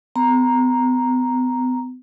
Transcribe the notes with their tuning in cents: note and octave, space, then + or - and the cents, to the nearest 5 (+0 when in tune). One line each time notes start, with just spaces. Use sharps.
B3 +40 A#5 +0